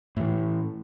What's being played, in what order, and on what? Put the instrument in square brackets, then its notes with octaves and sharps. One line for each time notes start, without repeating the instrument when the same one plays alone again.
[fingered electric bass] A2 E3